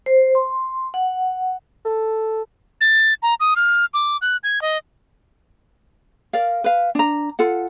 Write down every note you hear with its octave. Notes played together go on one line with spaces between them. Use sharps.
C5
C6
F#5
A4
A6
A#5
D#6
F6
D6
F#6
G#6
D#5
A#4 D5 F5
B4 F5
D4 A#5
F4 A4 F#5